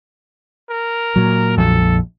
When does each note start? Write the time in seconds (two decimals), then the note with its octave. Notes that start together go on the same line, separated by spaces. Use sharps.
0.70 A#4
1.16 A#2 F#3
1.57 A#1 F2 A4